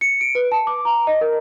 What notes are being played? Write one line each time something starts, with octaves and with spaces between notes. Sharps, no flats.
C#7
D7
B4
A5
D6
A#5
D#5
A#4